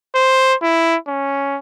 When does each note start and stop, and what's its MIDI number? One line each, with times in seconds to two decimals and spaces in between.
0.15 0.54 72
0.62 0.96 64
1.08 1.58 61